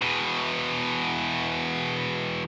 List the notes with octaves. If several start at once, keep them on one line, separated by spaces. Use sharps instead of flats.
E2 B2